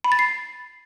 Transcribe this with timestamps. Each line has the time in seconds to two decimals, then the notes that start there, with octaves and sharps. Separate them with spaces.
0.04 B5
0.12 A6
0.19 C7